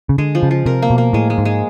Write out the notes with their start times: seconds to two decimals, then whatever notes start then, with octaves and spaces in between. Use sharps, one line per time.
0.09 C#3
0.18 D3 G#3
0.35 F3
0.43 C#3
0.51 F3
0.66 C3 A#4
0.82 A#3
0.90 B2
0.98 A#3
1.13 A2 G#3
1.30 G#3
1.38 G#2
1.45 G#3